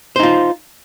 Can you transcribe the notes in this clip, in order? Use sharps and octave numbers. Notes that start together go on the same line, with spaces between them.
D#4 F4 C5